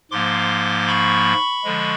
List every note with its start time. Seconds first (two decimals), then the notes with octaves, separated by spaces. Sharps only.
0.11 G#2 F3 A#3 C6 D6
0.87 B5 C#6
1.64 D3 F3 G#3